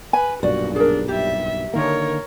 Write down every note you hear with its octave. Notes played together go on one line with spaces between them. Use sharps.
B4 G#5
B1 G2 A#2 F#4 D5
D4 G#4 A#4
G3 G4 E5
D3 D#3 A#3 A#4 C#5